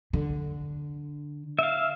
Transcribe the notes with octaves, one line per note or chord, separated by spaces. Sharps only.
D3
E5 F5